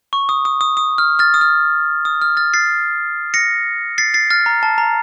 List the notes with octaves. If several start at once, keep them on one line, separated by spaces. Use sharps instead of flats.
C#6
D#6
D#6
D#6
D#6
F6
F6 A6
D#6
F6
D#6
F6
F6 A6
A6 C7
A#6 C#7
A6 C7
A6 C7
F6 A6
A#5
A5
A#5